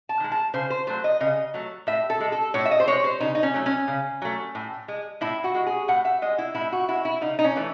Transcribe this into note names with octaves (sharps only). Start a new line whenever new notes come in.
A5
D#3 G#3
A5
C#3 C5
C5
F#3 A3 C5
D#5
C#3 D#5
F#3 A3
A2 E5
A4
G#3
A4
A2 C#5
E5
D#5
C5
G#3 C#5
C5
C#3 D#4
D#4
C#4
F#3 A3
C#4
C#3
F#3 A3
A2
G#3
A2 E4
F#4
G#3
G#4
A2 F#5
E5
G#3 D#5
E4
A2 E4
F#4
G#3 E4
E4
C#3 D#4
D#4
C#4
E3 A3